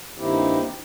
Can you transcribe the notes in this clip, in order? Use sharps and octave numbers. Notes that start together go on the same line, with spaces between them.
G2 D#3 A#3 C4 E4 G4